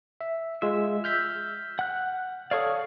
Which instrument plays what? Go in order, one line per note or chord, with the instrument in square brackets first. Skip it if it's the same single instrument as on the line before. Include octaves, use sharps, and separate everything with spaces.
[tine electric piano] E5
[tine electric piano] G#3 F4 [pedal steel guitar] E5
[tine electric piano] F6 G6 B6
[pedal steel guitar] F#5 F#6
[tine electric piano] A4 C#5 F5 [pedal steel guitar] D5 C#6 D#6